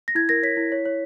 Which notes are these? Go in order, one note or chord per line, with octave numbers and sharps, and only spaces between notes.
A#6
E4 G#6
A#4 A#6
C#5 B6
E4
C#5
C#5